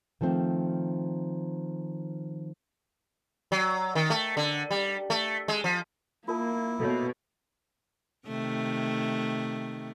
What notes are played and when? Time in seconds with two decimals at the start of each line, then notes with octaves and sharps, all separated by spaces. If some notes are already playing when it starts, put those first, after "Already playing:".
0.21 D#3 F3 A3 C4
3.52 F#3
3.95 D#3
4.10 A3
4.37 D3
4.71 G3
5.10 A3
5.48 G#3
5.64 F3
6.28 A#3 E4 F4 A#4 A5
6.80 B2 A4 C#5
8.27 C3 D#3 A3